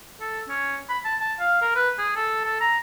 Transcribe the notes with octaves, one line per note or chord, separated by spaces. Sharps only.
A4
C#4
B5
A5
A5
F5
A#4
B4
G#4
A4
A4
A#5